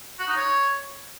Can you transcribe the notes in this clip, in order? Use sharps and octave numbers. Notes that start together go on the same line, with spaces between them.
F#4
D#4
C#5